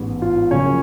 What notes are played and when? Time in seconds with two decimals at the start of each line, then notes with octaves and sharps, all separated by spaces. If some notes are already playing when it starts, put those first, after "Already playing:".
Already playing: A1 G#2 B3
0.22 F4
0.51 F#1 F#2 C#3 F3 C#4 C#5